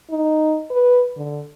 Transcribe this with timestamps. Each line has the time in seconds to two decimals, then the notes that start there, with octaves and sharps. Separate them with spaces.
0.10 D#4
0.71 B4
1.17 D3